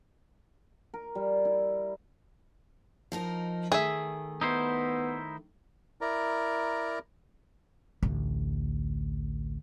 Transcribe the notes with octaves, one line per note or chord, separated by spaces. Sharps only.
A#4
G3
E4
F3 D#4 A#4
D#3 A3 G#4 E5
B3 D#4 E4 C5
E4 A#4 D5 A#5
A1 D2